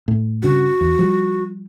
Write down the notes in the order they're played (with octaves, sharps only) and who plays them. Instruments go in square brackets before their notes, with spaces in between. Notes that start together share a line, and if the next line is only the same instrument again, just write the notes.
[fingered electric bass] A2
[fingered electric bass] G2 C#3 [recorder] F#4
[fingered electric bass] E2
F3 G3